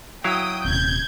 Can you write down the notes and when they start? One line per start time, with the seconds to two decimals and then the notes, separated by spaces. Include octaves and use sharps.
0.24 F#3 E4 F5 G5 D#6
0.64 D#1 C3 G6 G#6